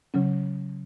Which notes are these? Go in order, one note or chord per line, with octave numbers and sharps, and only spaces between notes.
C#3 F#3 C#4